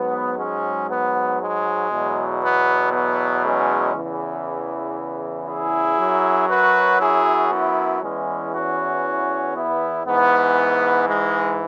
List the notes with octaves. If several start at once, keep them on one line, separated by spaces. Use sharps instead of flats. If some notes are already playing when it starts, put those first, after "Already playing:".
Already playing: G#2 F#3 B3
G#3 C#4
B3
G#3
E2 B2 F#3
B3
B3
G#3 C#4
E2 C#3 E3
E4 G#4
F#2 F#3
F#4 B4
E4 G#4
B3 E4
E2 E3 G#3 C#4
C#4 F#4
B3 E4
G#2 E3 B3
G#3